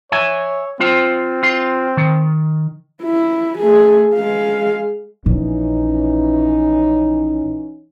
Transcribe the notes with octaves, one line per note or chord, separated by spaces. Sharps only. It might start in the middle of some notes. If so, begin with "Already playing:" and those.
C#5 E5 G#5
C4 F4 C5
F4 C6
D#3
E4
A3 G#4
G#3 F5
A#1 E3 C#4 D#4